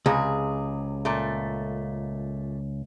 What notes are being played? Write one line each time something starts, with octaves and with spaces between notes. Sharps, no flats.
C#2 C3 G#4
A#2 A3